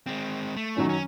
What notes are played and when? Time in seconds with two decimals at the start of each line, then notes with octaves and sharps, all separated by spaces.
0.07 G#3 C4
0.57 A3
0.76 F#2 D#3 F#3
0.89 C#4